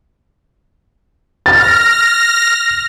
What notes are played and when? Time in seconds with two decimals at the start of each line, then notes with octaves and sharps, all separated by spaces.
1.46 F6 A6 A#6